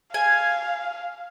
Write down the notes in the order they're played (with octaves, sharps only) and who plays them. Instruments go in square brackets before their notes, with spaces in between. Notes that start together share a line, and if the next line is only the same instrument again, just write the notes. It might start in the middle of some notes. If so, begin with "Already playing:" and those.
[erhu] F5 [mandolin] G#5